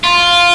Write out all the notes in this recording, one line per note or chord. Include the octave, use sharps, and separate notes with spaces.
F4